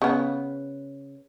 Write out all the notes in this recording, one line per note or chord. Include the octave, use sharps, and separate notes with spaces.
C#3 B3